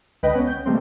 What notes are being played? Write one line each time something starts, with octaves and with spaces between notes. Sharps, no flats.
C#2 D3 B4 D#5 G5
B3 C#4
G6
C3 D#3 G3 A3 A#3 C4